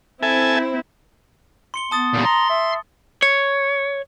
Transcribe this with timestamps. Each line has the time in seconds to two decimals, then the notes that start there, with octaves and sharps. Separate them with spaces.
0.23 C4 E4 A4 E5 G#5
1.74 C6 C#7 G7
1.91 B3 A5 D#6 A6
2.13 A#2 G3
2.25 A#5 C6
2.50 E5
3.22 C#5